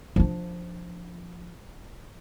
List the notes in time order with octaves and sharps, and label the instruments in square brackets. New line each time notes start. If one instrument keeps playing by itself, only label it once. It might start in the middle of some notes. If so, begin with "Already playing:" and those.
[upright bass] F3 D4